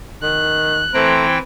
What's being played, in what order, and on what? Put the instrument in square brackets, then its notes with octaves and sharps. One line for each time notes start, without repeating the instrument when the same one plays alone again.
[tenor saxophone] D#3 [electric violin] F#6
[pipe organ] E3 E4 G5 [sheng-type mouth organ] A3 C5 A#5 [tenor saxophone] C4